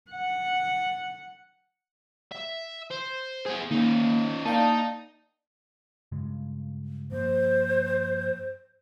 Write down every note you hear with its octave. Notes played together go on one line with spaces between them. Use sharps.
F#5
E5
C5
B3 G#4
D#3 A#3 C#4 D#4
A#3 D#4 D5 D#5 F5 G5 A5
G2 C#3 G#3
G2 F3 A#3 C5